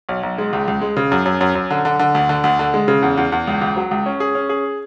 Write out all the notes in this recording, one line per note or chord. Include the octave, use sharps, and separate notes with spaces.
B1
B1
G#3
C#2
C#2
G#3
C#3
F#2
F#2
F#2
F#2
D3
D3
D3
D2
D3
D2
D3
G#3
C#3
E2
E2
E2
C#2
C#2
F#3
C#2
C#4
G#4
C#4
G#4